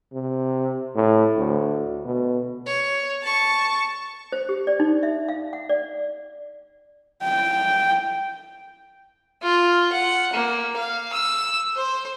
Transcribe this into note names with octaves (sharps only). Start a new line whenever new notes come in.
C3
A2
D2
B2
C#5
A5 C#6
C5
G4
D5
D#4
E5
F5
F#5
D5
G5
F4
F#5
A#3
F5
E6
C5